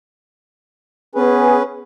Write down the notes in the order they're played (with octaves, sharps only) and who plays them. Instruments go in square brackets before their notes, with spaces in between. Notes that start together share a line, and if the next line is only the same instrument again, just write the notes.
[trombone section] B3 G#4 [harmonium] C#4 B4